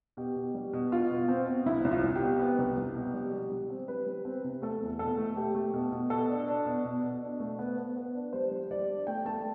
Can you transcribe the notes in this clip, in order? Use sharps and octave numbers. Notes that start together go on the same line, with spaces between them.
B2 G4
B2
G3
B2
B2 F4
B2
C4
B2
C2 E4
C2
F4
C2
G4
B2
B3
C2
C2
B2
G3
G3
G3
C4
G3 B4
G3
C4
C3
A3 A4
E2
B2 A4
A3
A3 G4
A3
B2
B2
B2 A4
D4
D4
B2
B2
B2
D4
A3
B3
B3
B3
D4
G3 C5
G3
G3 D5
D4
A3 G5
A3 A5